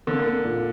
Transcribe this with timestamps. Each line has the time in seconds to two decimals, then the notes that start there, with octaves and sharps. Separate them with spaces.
0.07 D3 A#3
0.26 A#3
0.44 A#2